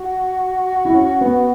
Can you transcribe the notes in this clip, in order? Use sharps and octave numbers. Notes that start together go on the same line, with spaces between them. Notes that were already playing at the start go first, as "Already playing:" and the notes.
Already playing: F#4
E4
C#4
B3